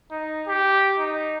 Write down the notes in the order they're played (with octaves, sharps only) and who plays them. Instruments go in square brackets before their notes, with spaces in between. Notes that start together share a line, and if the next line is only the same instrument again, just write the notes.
[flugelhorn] D#4
G4
D#4